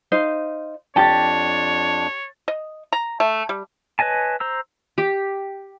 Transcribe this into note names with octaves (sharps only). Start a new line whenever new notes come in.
D#4 C5 F5
F2 D4 G4 C#5 G5 A5 A6
D#5
A#5
A3
G3
B4 C#5 D#5 G#5 A5
C5 A#5 E6
G4